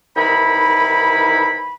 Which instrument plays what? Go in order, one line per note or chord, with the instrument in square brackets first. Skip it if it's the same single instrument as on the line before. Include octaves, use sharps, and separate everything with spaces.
[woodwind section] C2 D#3 E3 D#4 E4 B5